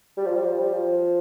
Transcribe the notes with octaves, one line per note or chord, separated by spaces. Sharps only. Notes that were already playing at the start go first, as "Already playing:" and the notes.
G3
F3
G3
F3
G3
F3